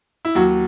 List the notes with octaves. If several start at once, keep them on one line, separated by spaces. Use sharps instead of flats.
E4
D#2 F#3 F#4